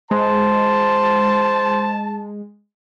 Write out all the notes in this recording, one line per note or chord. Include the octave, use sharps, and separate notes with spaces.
G#3 C5 A5